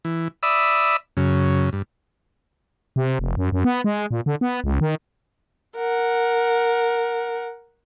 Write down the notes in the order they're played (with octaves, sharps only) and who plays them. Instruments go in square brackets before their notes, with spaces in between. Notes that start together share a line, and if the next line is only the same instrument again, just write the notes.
[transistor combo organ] E3
D5 E5 B5 D#6 E6
F#2 C#3
G2
[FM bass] C3
F1
F#2
F#2
B3
G#3
A#2
D3
B3
C#2
D#3
[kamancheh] A#4 F#5